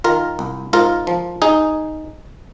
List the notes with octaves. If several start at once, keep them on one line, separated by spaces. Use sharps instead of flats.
D#3 F4 A#4
C2
G#2 F4 A#4
F3
D#4 G#4